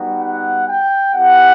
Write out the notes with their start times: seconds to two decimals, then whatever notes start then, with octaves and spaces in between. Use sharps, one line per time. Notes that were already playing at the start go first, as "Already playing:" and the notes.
Already playing: G3 B3 D#4 F#4
0.19 F#5
0.67 G5
1.14 B3 E4 G4 F#5